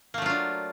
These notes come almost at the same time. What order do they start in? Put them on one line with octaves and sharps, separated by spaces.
A#3 A3 F#3 F4 D4